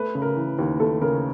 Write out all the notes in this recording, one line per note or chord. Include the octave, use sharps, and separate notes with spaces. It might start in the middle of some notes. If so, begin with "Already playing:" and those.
Already playing: A3 B4
C#3
A#4
E3
D#2
A3 A4
C#3 A#4